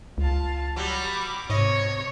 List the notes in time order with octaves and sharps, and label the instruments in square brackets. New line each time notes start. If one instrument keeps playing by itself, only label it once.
[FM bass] C#2 [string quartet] F4 F5 A5
[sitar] F#3 G3 [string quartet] B5 D6
[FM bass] G#2 [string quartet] C3 [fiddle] C#5 [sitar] D#5